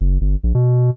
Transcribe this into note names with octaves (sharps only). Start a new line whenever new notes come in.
F#1
G1
A#1
B2